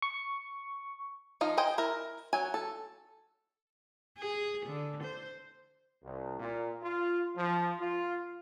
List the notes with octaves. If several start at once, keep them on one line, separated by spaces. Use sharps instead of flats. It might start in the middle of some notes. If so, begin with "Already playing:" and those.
C#6
F3 D#4 F5
C5 D#5 G5 G#5
E4 A#4
F#3 G#5
A4
G#4
D3
C5
C2
A#2
F4
F3
F4